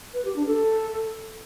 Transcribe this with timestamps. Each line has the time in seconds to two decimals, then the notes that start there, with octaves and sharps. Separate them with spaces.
0.14 B4
0.25 G4
0.36 D4
0.47 A4